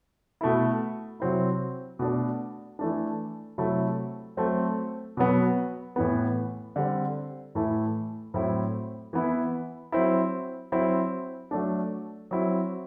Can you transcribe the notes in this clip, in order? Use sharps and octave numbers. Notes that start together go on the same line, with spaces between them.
B2 A3 E4
C3 F#3 C4 E4
B2 A3 D4
E3 A3 D4
C3 F#3 A3 E4
F#3 A3 C4
B2 F#3 B3
A2 E3 B3
D3 G3 C4
A2 E3 A3 E4
A2 F#3 C4 E4
E3 B3 E4
F#3 C4 E4
F#3 C4 E4
F#3 A3 D4
F#3 C4 E4